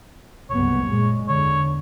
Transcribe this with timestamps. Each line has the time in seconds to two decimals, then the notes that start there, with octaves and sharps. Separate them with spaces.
0.50 F#1 C2 B3 C#5
0.87 A#2 G#3
1.28 E2 D3 C#5